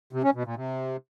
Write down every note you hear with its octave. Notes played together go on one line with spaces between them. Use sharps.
C3
C#4
B2
A#2
C3